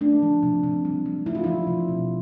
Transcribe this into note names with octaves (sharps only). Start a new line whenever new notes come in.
A3 D4
F3
C3
C3
G3
G3
A3 E4
F4
F3 E4
C3
B2